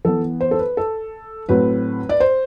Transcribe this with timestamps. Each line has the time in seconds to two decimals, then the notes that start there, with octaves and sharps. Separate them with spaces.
0.05 E3 B3 A4
0.41 C5
0.51 A4
0.59 B4
0.77 A4
1.49 A2 F#3 C4 B4
2.09 D5
2.20 C5